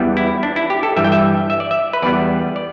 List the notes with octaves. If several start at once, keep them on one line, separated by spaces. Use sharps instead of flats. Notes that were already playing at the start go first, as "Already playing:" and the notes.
Already playing: E2 E3 G3 B3
E4
D4
E4
G4
A4
G2 E3 G3 E5
G5
E5
E5
D5
E5
B4
E2 E3 G3 B3 D5
D5